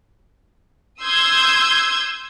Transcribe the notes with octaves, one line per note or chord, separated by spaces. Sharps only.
C6 D#6 E6 G6 G#6